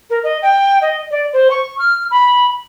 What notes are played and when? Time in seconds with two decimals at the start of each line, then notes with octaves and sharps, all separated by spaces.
0.10 A#4
0.23 D#5
0.42 G5
0.81 D#5
1.10 D5
1.32 C5
1.50 C#6
1.79 F6
2.10 B5